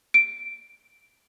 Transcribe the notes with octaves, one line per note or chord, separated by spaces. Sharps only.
D7